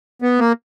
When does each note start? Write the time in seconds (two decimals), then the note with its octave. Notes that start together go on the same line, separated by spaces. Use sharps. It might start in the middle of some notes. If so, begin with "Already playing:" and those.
0.22 B3
0.39 A#3